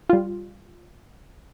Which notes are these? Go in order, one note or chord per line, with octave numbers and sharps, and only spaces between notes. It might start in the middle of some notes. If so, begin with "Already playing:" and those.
G3 F4